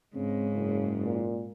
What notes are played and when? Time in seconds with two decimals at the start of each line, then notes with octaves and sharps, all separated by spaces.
0.15 G#2 C#3 C4
0.54 F#1
1.05 A#2